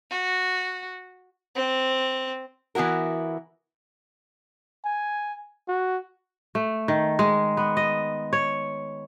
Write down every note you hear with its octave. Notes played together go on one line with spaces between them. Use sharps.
F#4
C4
E3 B3 E4 F#4 A#4
G#5
F#4
A3
D#3
G#3
B3
D#5
C#5